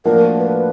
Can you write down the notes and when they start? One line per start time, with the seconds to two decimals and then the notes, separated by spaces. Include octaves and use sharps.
0.05 A2 F3 A#3 D4 F#4 A#4
0.38 B4